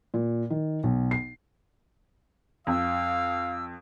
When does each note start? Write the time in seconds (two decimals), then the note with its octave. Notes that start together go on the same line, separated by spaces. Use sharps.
0.14 A#2
0.50 D#3
0.84 B1
1.11 C7
2.67 F2 F5 E6